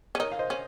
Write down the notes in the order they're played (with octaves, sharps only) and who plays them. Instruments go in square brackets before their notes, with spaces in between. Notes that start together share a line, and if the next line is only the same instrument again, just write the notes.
[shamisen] C#4
[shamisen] D#4 [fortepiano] A#4 C#5
[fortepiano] F5
C5 D#5
[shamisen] C#4